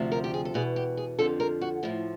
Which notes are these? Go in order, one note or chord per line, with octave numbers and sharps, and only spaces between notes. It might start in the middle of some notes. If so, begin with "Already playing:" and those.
Already playing: D2 C3 F3
A#4
G4
G#4
A4
E2 B2 G#4
G4
G#4
F2 D3 F3 A4
A#4
F#4
A2 F3 E4